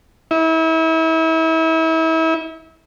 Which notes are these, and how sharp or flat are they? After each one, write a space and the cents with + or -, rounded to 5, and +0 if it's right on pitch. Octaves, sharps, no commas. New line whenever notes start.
E4 -35